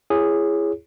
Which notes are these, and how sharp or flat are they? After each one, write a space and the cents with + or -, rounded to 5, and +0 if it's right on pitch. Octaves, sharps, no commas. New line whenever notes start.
E4 +30 G#4 -10 C#5 +0